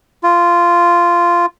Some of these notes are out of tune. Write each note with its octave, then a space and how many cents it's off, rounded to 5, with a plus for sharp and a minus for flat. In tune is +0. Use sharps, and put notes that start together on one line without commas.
F4 -10